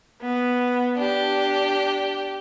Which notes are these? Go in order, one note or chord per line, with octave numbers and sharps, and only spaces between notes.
B3
D4 G4